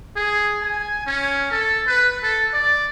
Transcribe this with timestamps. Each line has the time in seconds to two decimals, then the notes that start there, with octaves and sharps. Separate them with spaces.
0.16 G#4
0.62 G#5
1.06 C#4
1.51 A4
1.87 B4
2.23 A4
2.53 D5